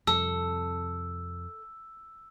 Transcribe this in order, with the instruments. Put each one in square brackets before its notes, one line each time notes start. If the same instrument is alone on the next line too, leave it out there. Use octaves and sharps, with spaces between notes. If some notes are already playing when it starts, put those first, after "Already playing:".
[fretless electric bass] F2 C3 G3 [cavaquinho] A4 [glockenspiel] E6